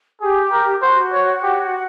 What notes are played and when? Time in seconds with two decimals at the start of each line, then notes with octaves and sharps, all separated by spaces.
0.21 G4 G#4
0.52 A#4
0.82 F#4 C5
1.13 C#5
1.43 G4